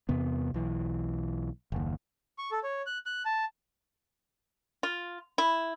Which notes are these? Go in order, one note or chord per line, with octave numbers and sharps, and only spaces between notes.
E2 C3 B3
B1 E3
F#1 D#2
C#6
A4
C#5
F#6
F#6
A5
F4
E4